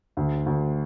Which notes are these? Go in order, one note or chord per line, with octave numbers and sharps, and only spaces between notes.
D2
D2